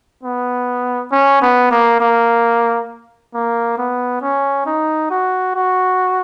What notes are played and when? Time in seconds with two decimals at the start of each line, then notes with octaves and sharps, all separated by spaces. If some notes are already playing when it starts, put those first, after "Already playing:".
0.23 B3
1.12 C#4
1.42 B3
1.71 A#3
2.00 A#3
3.34 A#3
3.78 B3
4.22 C#4
4.66 D#4
5.11 F#4
5.55 F#4